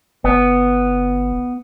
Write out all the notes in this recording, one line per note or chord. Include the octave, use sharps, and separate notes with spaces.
G1 B3